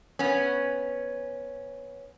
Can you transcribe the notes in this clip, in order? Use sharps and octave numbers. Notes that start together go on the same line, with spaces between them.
B3 C#4